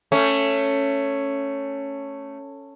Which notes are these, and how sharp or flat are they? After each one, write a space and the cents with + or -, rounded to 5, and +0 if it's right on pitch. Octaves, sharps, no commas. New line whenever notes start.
A3 +15 C#4 +0